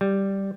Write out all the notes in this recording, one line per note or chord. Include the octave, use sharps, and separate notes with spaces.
G3